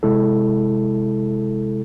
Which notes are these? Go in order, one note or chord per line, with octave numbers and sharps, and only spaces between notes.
C3 G#3 E4 A4